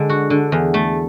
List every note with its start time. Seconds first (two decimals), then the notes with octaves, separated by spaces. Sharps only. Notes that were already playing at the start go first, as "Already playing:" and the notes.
Already playing: D3 G#3
0.10 F#4
0.30 D3
0.52 E2
0.74 A3